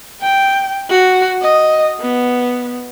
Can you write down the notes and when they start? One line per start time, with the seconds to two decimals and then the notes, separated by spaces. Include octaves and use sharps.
0.22 G5
0.90 F#4
1.42 D#5
2.00 B3